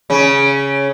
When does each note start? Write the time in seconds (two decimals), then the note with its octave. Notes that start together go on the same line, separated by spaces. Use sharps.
0.10 C#3 C#4